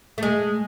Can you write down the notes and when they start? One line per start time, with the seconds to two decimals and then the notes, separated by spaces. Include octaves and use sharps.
0.18 A3
0.23 G#3